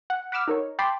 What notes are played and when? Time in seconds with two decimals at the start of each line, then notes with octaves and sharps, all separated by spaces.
0.10 F#5
0.32 F#5 B5 D6 E6 F6
0.48 D#4 A#4 C#5
0.79 G5 A5 B5 C6 D6